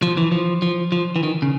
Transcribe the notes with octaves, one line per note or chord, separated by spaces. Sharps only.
F3
E3
F3
F3
F3
E3
D#3
C#3